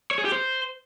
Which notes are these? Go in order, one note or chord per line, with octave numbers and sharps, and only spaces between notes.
C#5
G#4
G4
C5